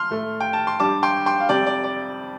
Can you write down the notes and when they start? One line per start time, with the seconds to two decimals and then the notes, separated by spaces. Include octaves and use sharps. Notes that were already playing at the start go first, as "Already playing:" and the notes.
Already playing: C6 F6
0.11 A2 A3
0.40 G5
0.53 A5
0.67 C6
0.80 G2 G3 A5 D6
1.03 G5 C6
1.26 G5 C6
1.40 F5
1.49 F2 C3 G3 D5 G5
1.66 D5
1.84 D5